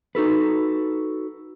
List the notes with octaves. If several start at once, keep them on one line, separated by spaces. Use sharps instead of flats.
D#4 F#4 A4 B4